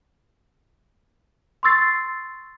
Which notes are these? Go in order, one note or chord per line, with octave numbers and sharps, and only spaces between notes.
C6 C#6 E6 A6 C7